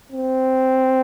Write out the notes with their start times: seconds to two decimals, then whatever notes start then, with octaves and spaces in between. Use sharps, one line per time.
0.12 C4